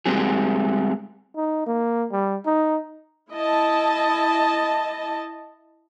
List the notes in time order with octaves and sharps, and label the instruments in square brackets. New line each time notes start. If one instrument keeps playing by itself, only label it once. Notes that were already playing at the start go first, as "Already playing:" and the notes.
[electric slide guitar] G3 G#3 C4 F#4 G#4
[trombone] D#4
A#3
G3
D#4
[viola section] E4 D#5 A5